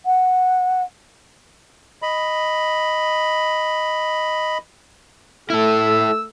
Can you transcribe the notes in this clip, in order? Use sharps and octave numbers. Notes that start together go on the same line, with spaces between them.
F#5
D#5 B5
A3 E4 A4 E6